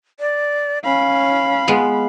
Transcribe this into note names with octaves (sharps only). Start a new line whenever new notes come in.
D5
C#4 F5 B5
G#3 B3 F4